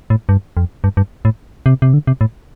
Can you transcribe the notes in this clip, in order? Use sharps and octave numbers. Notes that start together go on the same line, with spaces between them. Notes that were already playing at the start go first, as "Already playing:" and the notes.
A2
G2
F2
G2
G2
A2
C3
C3
D3
C3
A2